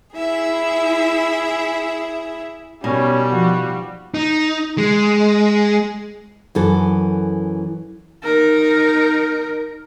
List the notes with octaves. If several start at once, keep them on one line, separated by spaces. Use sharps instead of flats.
E4 G#4 E5
B2 G3 B3 C#4 D#4 A#4
F3 B3 F#4
D#4
G#3
F#2 E3 A4
D#4 A#4